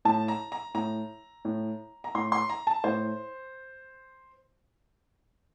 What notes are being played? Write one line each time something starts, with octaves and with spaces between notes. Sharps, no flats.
A2 A5
A#5
A#5
A2 A#5
A2
A#5
A2 C6
C6
A#5
A5
A2 C5